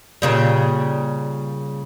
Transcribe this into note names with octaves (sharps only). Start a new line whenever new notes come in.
A#2 C#3 G3